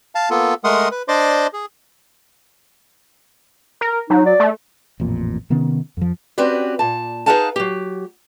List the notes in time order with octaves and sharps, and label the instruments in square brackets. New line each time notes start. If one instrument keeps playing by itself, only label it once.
[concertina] F5 A5
A#3 B3 F4 A4
G#3 A3 A#4 F#5 C6 D#6
B4
D4 C5 D5 D#5 C6 D6
G#4
[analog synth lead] A#4
[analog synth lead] F#3 [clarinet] D#4
[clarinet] D5
[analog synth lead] A3
[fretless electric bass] A1 F2 A#2
C3 D#3 B3 C#4
F2 F3
[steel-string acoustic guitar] C4 C#4 F#4 G4 B4 D5
A#2 A5
D#4 G#4 B4 F5 F#5 A5
F#3 G4